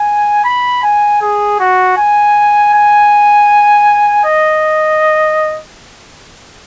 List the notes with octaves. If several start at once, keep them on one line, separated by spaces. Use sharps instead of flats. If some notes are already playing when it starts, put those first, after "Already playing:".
Already playing: G#5
B5
G#5
G#4
F#4
G#5
G#5
D#5